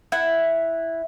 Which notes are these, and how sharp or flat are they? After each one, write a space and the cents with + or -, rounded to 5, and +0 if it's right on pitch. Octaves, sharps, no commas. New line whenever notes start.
E4 +0 F#5 +0